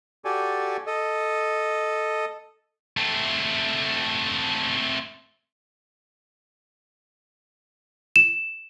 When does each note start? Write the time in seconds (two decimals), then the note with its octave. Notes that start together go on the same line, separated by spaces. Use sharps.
0.25 F#4 G4 A4 D5 G#5
0.87 A4 D#5
2.97 A3 C4
8.16 E7